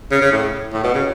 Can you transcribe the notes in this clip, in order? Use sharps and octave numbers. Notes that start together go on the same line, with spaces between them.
C#3
C#3
A2
A2
B2
C#3